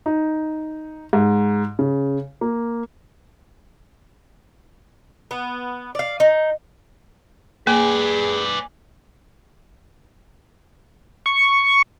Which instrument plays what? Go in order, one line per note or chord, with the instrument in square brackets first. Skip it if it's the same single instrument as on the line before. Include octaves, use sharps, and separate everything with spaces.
[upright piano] D#4
G#2
C#3
A#3
[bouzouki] B3
D5 F5
D#4
[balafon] A#3 [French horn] G#4 [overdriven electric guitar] B4 D5 [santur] G#5
[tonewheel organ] C#6